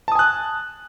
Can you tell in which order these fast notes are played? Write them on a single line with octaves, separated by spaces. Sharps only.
A5 D#6 G#5 F#6